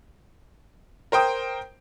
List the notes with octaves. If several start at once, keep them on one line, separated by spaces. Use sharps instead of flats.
A#4 C5 G5 D#6